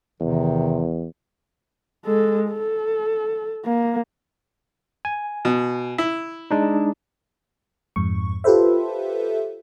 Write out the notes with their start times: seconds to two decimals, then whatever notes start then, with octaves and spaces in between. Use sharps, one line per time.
0.21 E2 C3 D#3
2.06 G#3 A4
2.51 A4
3.65 A#3
5.05 G#5
5.45 B2
5.98 E4
6.51 G#3 D4 D#4
7.96 F2 G#2 C#6
8.44 F4 G4 A4 B4 C5 E5